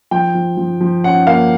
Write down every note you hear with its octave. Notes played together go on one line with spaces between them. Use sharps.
F3 G5
F3
F3
F3
C#4 F#5
A#3 F5